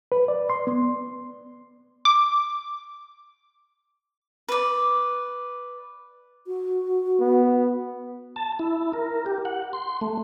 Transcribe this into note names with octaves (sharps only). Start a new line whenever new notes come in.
B4
D5
C6
B3
D6
B4 D5
F#4
B3
A5
E4
A#4
G4
F#5
C6
A3